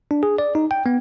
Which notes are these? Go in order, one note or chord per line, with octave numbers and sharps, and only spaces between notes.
D4
G#4
D5
D#4
G5
B3